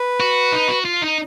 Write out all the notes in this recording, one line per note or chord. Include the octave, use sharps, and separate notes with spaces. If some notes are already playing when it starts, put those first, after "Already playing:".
Already playing: B4
F#4
D#4
F#4
F4
D#4